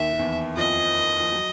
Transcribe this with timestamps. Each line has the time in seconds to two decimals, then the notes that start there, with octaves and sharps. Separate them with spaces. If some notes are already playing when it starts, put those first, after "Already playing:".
Already playing: D#2 D#3 E5
0.13 D#3
0.19 E2 E3
0.57 F2 F3 D#5
1.20 F3
1.32 F#3